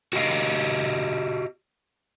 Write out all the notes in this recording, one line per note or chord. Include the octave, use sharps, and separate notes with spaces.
F#4 G4 D#5 F5